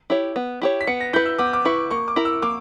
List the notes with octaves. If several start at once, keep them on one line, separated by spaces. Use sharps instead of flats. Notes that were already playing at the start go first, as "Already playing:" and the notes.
E4 G4 C#5
B3
E4 G4 C#5
B6
B3 C#7
A#6
E4 B4 G6
E6
B3 D6
D6
E4 B4 C#6
A#3 C#6
D6
E4 A#4
E6
A#3 D6